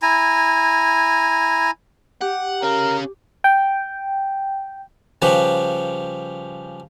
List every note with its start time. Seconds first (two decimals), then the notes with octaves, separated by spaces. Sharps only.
0.02 E4 G#5 A#5
2.21 G4 F#5
2.62 C#4 A#4 F5
3.44 G5
5.22 C#3 F3 G3 B4